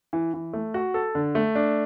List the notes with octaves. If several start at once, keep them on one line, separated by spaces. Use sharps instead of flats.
E3
E3
A3
F#4
A4
D3
A3
D4